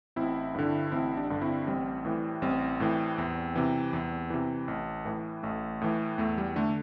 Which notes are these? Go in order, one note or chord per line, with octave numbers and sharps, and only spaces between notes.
A1 C4 E4
G2 D3
A1 C4 E4
D4 G4
G2 D3
C4 E4
A1 G3 C4
A2 E3
A1 G3 C4
A2 E3
E2
C3 E3
E2
C3 E3
A1
A2 E3
A1 A3
A2 E3
E2 A3
G3
D3 A3